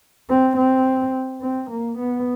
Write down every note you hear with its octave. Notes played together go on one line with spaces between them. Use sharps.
C4
C4
C4
A#3
B3